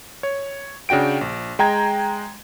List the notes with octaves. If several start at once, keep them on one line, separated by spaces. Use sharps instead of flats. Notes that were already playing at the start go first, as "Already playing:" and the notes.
C#5
C#3 D4 F#4 G5 D7
A#1
G#3 G5 A#5 G#6